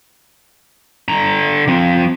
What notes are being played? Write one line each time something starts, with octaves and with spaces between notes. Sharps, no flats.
D3 A#5
F3 C4